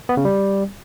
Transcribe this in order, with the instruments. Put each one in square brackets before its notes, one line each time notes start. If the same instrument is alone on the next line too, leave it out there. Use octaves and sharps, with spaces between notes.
[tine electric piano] B3
C#3
G3